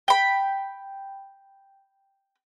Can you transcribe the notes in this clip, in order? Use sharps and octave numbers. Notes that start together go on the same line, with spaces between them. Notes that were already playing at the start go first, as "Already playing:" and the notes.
G5 B5